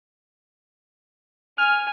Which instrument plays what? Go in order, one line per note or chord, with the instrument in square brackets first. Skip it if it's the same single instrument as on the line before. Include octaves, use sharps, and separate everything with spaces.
[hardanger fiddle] G#5 [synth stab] F6